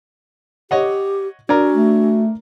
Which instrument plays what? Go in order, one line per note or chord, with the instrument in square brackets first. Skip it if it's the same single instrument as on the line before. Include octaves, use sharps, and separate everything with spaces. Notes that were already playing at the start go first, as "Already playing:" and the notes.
[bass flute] G4 [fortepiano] C#5 D#5 F#5
[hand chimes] D4 [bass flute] F#4 [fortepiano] A#4 D5
[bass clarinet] A3